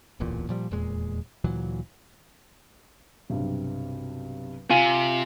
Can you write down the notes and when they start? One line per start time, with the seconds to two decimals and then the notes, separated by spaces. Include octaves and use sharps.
0.20 D1 A1 E2 A#2
0.49 A#2 F3 G3
0.71 D#1 E2 A#2 G#3
1.44 D2 A#2 E3 F#3
3.30 B1 G2 C3
4.70 C3 F4 G#5